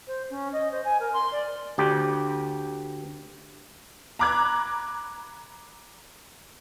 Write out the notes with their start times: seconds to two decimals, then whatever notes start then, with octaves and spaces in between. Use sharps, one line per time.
0.07 C5
0.30 C#4
0.53 D#5
0.72 C5
0.85 G#5
1.00 A#4
1.13 C6
1.32 D5
1.78 D2 G4
4.19 A#5 B5 D6 F#6 G#6